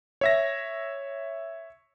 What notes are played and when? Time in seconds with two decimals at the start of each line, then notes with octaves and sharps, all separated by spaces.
0.21 C#5 E5 A#6